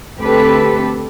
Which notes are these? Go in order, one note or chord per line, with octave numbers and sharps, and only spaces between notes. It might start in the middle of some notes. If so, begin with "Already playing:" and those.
D2 C4 G4 A4 B4